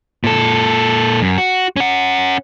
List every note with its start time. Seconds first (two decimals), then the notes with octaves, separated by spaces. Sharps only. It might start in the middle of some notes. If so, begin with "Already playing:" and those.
0.24 A#2 A4
1.22 F#2
1.38 F#4
1.77 C#4 F#5